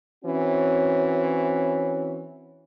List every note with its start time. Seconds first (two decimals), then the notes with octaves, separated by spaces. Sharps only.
0.25 E3 C4 C#4 F#4 C#5